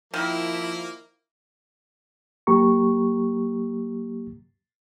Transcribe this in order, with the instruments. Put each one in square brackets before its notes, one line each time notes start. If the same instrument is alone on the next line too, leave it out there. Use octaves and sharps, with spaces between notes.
[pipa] D#3 [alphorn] F3 [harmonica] A#3 [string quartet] E4
[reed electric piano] F#3 A#3 G4 A#5 C#6